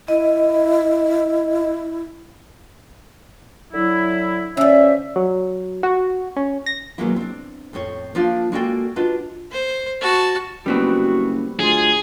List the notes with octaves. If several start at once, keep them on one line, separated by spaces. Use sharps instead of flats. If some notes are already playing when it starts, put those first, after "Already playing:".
E4 D#5
D3 F#3 E4
D3 F3 C#4 E5
F#3
F#4
C#4
A#6
B2 D#3 F#3 G#3 A#3 E4
C4 D4
F2 A2 C4 C#5
F3 A#3 D4 F4 C5 F5
G#3 A#3 F#4 A4 D5 G5
D4 F4 F#4 B4 D#5
C5
F#4 A5
F#1 G3 B3 C4 F#4
D2 F4 G#4